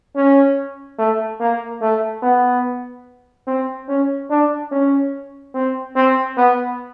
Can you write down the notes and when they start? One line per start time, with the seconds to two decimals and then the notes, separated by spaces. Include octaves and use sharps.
0.16 C#4
0.99 A3
1.40 A#3
1.81 A3
2.23 B3
3.47 C4
3.89 C#4
4.30 D4
4.72 C#4
5.55 C4
5.96 C4
6.37 B3